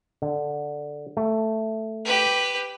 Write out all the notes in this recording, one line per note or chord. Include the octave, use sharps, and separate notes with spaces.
D3
A3
G4 B4